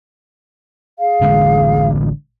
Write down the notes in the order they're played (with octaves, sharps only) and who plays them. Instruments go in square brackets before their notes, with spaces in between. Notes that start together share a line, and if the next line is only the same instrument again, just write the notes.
[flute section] G#4 F5
[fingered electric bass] A1 D3 G#3